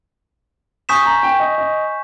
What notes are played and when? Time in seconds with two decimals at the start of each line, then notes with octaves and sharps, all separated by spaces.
0.89 G#5 C#6 D#6 G6 B6 E7
1.05 A#5
1.23 G5
1.40 D#5
1.58 D#5